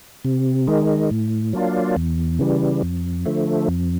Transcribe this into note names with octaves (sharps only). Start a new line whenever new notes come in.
C3
D#3 G#3
A2
F#3 A#3 D4 F4
E2
C#3 E3 G3
F2
D3 F3 A3
F2